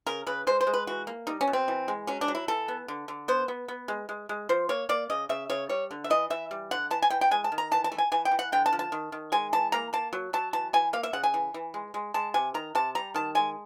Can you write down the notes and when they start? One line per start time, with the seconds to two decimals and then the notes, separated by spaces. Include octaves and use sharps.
0.06 C#3 A#4
0.27 C#3 B4
0.47 G#3 C5
0.61 C5
0.67 G#3
0.74 B4
0.87 E3 F#4
1.07 A#3
1.27 G3 D#4
1.41 C#4
1.47 B2
1.53 C4
1.68 E3
1.88 G#3
2.07 F#3 C#4
2.21 D4
2.28 F#3
2.35 E4
2.48 E3 A4
2.68 B3
2.88 D3
3.08 D3
3.28 B3 C5
3.48 B3
3.68 B3
3.88 G#3
4.09 G#3
4.29 G#3
4.49 F3 C5
4.69 A#3 C#5
4.89 A#3 D5
5.10 C#3 D#5
5.29 C#3 E5
5.50 C#3 C#5
5.69 G3 C#5
5.91 D3
6.04 E5
6.10 E3 D#5
6.30 E3 E5
6.51 G3
6.71 D3 F#5
6.91 E3 A5
7.02 G#5
7.10 E3 G5
7.21 G5
7.31 G#3 G#5
7.44 A5
7.52 D#3
7.58 A#5
7.71 E3 A5
7.84 A5
7.92 A3
7.98 G#5
8.12 E3 G#5
8.25 G5
8.31 E3
8.39 F#5
8.52 D3 G5
8.66 A5
8.73 F3
8.79 A5
8.92 D#3
9.12 D#3
9.32 G#3 G#5
9.53 E3 A5
9.72 A#3 A#5
9.93 A#3 A5
10.13 F#3
10.33 F#3 A5
10.53 E3 A5
10.73 E3 G#5
10.93 A#3 F5
11.03 E5
11.13 C#3 F#5
11.23 G#5
11.34 E3
11.54 E3
11.74 G#3
11.94 G#3
12.14 G#3 A5
12.34 C3 G#5
12.54 D#3 A#5
12.75 C3 A5
12.95 G3 A#5
13.14 D#3 A5
13.35 G#3 G#5